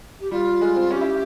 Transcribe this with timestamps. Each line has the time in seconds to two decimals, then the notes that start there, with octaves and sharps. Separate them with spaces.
0.20 G4
0.31 G3 F4
0.61 G#3
0.76 C4
0.91 C#4 G4
1.01 E4